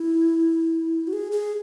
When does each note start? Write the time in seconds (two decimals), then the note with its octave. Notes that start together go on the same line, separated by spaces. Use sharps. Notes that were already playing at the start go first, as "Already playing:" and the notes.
Already playing: E4
1.07 F#4
1.13 G#4
1.32 G#4